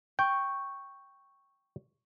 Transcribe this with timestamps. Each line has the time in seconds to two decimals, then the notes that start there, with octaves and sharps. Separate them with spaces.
0.19 G5 C#6